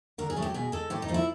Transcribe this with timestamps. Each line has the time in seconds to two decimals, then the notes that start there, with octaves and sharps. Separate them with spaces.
0.18 D3 A#4
0.30 G#4
0.36 F#3 A3
0.42 G4
0.54 B2 G#4
0.72 G#3 A4
0.90 A2 G4
1.02 D#4
1.08 F3 A3
1.14 E4